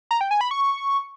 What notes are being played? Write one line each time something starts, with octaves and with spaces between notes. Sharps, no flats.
A#5
G5
G#5
B5
C#6